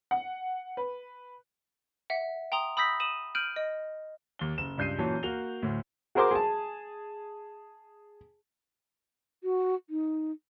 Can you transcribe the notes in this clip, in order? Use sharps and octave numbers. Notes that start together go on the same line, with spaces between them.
F#5
B4
E5 F#5
G5 A#5 C6 D#6 F7
B5 D#6 E6 G6 A#6 B6
D#6 D#7 E7 F#7
F6 G6 D7 D#7 F#7
D#5
D#2 G7
F#1 E7
C#2 G2 G6 C7 D#7
F#2 A#2 E3 F#3 C#5 A5
A#3 F#4 F7 G7
D2 A2
F#4 G#4 A#4 C5 C6 D6
G#4 A5
F#4
D#4